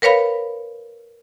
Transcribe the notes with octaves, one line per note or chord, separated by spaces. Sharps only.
A#4 B4 C#5 F5 B5